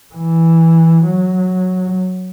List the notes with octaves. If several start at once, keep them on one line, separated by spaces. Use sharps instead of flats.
E3
F#3